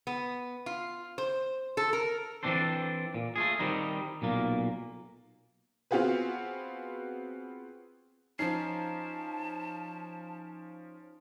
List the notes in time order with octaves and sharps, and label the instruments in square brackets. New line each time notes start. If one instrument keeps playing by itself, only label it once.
[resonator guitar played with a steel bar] B3
F4
C5
A4
A#4
[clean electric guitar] E3 G#3 C4 D4 A4 C5
A#2
A3 F4 G#4
D#3 G3 C4 D#4
B1 A#2 A#3
[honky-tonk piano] B3 C4 F4 F#4 G#4 B4
[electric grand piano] F3 C#4 [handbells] D#4 C7 [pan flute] A5